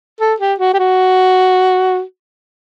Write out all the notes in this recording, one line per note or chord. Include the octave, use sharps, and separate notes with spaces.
A4
G4
F#4
G4
F#4